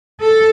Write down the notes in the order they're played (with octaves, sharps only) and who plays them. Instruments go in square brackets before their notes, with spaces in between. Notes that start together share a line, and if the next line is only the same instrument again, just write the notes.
[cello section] A4